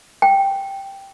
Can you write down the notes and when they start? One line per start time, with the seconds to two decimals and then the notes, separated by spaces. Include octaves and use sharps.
0.22 G5